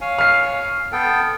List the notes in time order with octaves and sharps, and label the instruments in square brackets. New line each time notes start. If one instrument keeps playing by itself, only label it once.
[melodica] C#5 F5 G#5
[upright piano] F6 C7
[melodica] B3 A4 G5